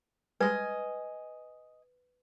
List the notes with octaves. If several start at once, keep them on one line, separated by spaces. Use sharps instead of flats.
G3 G#3 B4 D#5 G#5